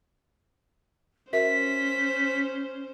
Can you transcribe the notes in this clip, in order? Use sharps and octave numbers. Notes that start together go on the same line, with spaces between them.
C#4 F#4 A#4 C5 E5 B6